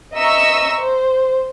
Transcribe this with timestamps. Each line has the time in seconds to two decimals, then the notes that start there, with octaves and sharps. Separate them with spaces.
0.14 D#5 E5 A#5 C#6 E6
0.80 C5